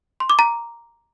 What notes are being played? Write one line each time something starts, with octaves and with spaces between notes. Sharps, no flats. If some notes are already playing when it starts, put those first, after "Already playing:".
C6
D6
A#5